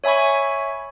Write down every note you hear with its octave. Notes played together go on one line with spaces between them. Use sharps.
C#5 E5 G#5 B5 C#6